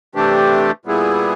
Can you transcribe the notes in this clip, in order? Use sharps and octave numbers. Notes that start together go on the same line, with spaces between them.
C3 E3 A3 D4 G4
A#2 G3 B3 E4 G#4